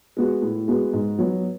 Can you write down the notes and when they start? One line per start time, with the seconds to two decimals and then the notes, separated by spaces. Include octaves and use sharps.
0.17 G#3 B3 F#4
0.42 A2
0.68 G#3 B3 F#4
0.93 G#2
1.19 F#3 B3